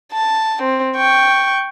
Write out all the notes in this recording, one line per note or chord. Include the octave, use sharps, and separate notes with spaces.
A5
C4
G5 C#6